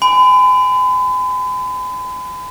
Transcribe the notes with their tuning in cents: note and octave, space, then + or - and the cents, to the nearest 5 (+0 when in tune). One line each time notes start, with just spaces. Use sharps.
G#5 +0 B5 +40